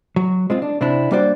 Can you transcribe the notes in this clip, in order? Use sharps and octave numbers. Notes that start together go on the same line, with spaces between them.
F#3
G#3 C4 F4
D4
C3 C4 D4 E4
G3 A#3 D4 F#4 C5 D5